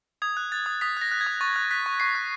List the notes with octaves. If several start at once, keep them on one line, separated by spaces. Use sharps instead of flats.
D#6 G#6
F#6
F#6 A6
D#6
D#6 B6
F#6 A#6
F#6
G#6
D#6
C#6 A6
F#6
F#6 B6
C#6
C#6 C7
F#6